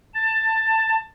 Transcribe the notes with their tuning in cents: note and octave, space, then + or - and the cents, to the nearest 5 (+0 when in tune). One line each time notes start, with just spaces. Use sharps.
A5 +15